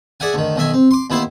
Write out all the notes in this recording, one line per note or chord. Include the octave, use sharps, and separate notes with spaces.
G#4 D5 E5 F#5 G#5
D2 D#3
B1 D#3 E5 G#5
C4
C6 D6
D#2 B3 E4 C5 C6